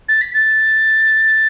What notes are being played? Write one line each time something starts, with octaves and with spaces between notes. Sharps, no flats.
A6
B6
A6